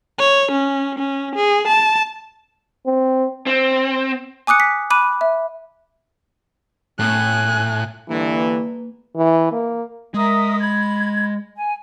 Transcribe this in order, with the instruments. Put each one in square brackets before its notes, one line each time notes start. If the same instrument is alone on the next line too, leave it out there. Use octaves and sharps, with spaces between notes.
[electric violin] C#5
C#4
C#4
G#4
A5
[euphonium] C4
[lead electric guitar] C4
[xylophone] G#5 D6 D#6 F#6 C#7
B6
B5 D6 F#6 D#7
E5
[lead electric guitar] A2 [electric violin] G#5 F#6
[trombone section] G2 D3 E3 [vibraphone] A#3 B4
[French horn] E3
A#3
[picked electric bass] G#3 [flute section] A#4 E5 D#6
[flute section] B5 G#6
G#5